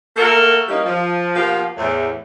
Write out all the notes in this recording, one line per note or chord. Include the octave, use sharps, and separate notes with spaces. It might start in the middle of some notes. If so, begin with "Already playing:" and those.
A3 A#3 F#4 A4 A#4
E3 G3 A#3 C#4 D#4
F3
B2 F3 A#3 B3 F4 G4
E2 A2